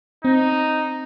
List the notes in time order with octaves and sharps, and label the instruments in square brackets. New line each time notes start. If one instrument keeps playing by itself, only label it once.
[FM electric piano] C4 [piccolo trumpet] D#4